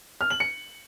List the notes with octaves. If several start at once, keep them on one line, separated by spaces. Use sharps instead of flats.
F6
F#7
C#7